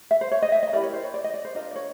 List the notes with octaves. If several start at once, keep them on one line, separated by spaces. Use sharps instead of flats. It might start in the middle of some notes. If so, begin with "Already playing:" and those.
E5
C5
C#5
D#5
E5
D#5
E4 G4 A#4 D5
C#5
C5
C#5
D5
D#5
D5
C5
D4 F4 A#4 D#5
D5
C#5